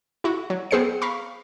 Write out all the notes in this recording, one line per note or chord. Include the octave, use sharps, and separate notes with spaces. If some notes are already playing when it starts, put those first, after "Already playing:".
E4 F#4
F#3
B3 C4 G#4 C5 C7 C#7
F5 A#5 B5 C#6